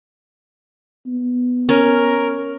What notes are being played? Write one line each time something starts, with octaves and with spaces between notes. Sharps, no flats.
B3
C#4 A#4